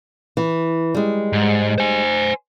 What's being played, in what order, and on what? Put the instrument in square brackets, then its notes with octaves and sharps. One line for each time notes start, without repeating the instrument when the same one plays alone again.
[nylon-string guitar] E3
G3 G#3
[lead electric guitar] G#2
C5 G#5